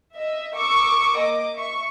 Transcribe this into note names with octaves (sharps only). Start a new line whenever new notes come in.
D#5 E5
A#4 C#6 D6 E6
A#3 D#5 D6
E5 C#6